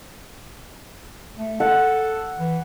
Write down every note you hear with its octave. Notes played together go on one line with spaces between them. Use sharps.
A3
A4 F#5
E3